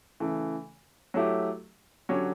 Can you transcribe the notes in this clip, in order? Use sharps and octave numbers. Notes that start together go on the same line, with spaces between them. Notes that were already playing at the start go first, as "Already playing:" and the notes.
C#3 E3 A3
F#3 A3 E4 G4
D3 F#3 C#4 G4 C#5